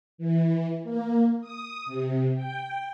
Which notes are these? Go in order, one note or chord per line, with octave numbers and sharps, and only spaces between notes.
E3
A#3
D#6
C3
G5